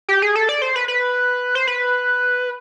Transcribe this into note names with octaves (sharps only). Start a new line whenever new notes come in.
G4
G#4
A4
D5
C5
B4
B4
C5
B4